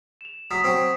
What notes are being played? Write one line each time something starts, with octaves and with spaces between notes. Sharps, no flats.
E7 F7
F#3 D#6 B6 C7
F#3 C4